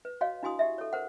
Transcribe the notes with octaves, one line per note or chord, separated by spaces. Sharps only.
B4
F#4 C#5 D#5 F5
D4 E4 F#4 G#5 C6 D#6
G4 D#5 E5
A4 C#5
A#4 C5 F#5